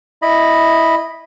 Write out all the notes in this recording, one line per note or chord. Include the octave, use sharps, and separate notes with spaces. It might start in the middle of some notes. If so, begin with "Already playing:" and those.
E4 D#5 B5